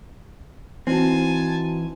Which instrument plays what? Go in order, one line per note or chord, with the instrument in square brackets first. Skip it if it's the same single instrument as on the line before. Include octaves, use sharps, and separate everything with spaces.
[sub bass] E3 [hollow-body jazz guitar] C4 [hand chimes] D#4 E4 F#4 [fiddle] G#5 A5